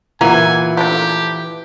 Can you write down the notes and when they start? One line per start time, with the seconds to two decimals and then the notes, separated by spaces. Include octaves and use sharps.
0.21 A#2 E3 F4 F#5 G#5 A#5
0.77 F3 A3 D4 G4